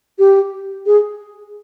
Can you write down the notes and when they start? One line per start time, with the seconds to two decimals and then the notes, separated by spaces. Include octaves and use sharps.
0.19 G4
0.86 G#4